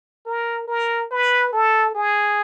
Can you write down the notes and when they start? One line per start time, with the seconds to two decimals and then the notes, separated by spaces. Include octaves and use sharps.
0.26 A#4
0.67 A#4
1.11 B4
1.53 A4
1.94 G#4